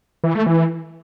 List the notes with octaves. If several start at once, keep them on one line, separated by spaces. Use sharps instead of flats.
E3
A3
E3